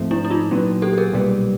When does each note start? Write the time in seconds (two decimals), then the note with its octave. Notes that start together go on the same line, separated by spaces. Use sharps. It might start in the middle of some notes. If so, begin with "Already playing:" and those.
Already playing: G#2 F3 A3 C4
0.11 D4 E4
0.25 E4
0.30 D#4 F4
0.51 A#2 F#3 B3 C#4
0.82 G4 A4
0.93 A4
0.98 G#4 A#4
1.13 B1 A#2 G3 B3